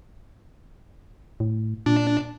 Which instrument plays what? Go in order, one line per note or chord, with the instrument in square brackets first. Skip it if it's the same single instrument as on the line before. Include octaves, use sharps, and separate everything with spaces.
[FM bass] A2
[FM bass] A#2 [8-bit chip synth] D4